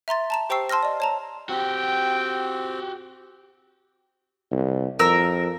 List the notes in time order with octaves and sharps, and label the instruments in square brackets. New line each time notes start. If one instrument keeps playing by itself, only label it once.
[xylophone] E5 A#5 C6 A6
A5 A#5 E7
G4 C5 G5 C#6 E6 C7
A5 C6 E6 F6 A#6
D5 D#5
C#5 A5 A#5
[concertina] C4 [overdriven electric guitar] F#4 G4 [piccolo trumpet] G5
[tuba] C2
[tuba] F2 [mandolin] A#4 E6